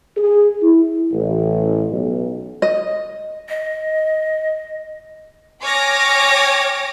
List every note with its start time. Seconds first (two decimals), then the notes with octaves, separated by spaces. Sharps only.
0.17 G#4
0.62 E4
1.12 A1
1.90 B1
2.62 D#5
3.49 D#5
5.62 C#5 G5 G#5 D6 F6 A#6